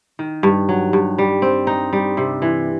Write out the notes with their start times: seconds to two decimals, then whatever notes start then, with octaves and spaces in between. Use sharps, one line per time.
0.19 D#3
0.43 G2
0.69 F#3
0.93 G2
1.18 G3
1.42 C4
1.67 D#4
1.93 G3
2.17 C3
2.42 E3